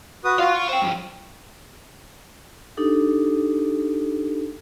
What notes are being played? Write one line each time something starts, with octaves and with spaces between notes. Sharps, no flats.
F#4 B4 D#6
F4 F#4 F5 C6
C#6
C5 G5
G2 F3
D4 D#4 G4 A4